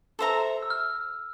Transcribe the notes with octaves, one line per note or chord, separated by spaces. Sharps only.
A4 C5 E5 A#5
E6
F6